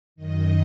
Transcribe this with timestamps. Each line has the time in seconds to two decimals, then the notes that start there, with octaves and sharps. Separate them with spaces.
0.16 F#2 D#3 D#5